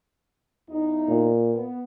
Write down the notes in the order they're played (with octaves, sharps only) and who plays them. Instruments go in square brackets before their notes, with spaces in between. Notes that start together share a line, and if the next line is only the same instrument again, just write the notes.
[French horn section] E2 D#4
[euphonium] A#2
[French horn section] B3